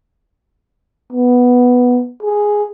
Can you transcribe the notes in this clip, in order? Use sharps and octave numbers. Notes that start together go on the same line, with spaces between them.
B3
G#4